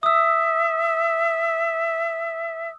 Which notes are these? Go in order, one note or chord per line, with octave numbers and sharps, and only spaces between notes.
E5 D#6 E6